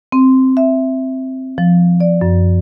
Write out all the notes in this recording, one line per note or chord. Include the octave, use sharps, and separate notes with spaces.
C4
E5
F3
D5
F#2